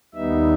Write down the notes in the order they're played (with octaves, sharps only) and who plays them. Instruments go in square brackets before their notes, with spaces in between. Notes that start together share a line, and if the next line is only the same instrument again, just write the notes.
[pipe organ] D#2 D#3 G3 B3 D#4 E5